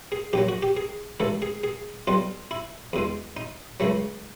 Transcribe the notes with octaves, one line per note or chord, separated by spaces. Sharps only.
G#4
A#1 A#2 F#3 G4
F#4
G4
G#4
A1 G#2 E3 A4
G#4
G#4
B1 B2 G3 F4
E4
E2 B2 G#3
D#4
C#2 C#3 F#3 A3